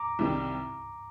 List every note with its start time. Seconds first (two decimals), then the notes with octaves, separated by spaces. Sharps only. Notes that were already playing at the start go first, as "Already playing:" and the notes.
Already playing: A#5 D6
0.19 C2 C3 D#3 G3 C4